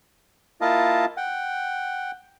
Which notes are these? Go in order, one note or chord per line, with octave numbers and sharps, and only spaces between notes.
A#3 E4 F4 D#5 F5 A5
F#5 G5